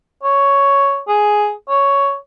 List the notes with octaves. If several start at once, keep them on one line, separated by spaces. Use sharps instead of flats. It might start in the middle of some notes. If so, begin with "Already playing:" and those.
C#5
G#4
C#5